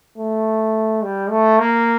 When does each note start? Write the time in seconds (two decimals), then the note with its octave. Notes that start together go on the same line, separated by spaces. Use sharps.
0.17 A3
1.03 G3
1.30 A3
1.59 A#3